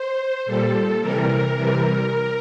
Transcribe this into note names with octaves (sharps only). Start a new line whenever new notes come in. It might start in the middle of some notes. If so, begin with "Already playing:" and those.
Already playing: C5
A#2 G3 A4
C3 E3 G3 A#4
C3 E3 G3